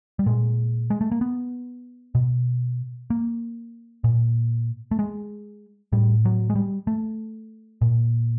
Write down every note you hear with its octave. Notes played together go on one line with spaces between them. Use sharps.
G3
A#2 G#3
G#3
A3
A#3
B3
B2
A#3
A#2
A3
G#3
A2 G3
F#3
G#3
G3
A3
A#2